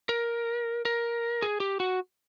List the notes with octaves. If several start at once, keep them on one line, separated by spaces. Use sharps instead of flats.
A#4
A#4
G#4
G4
F#4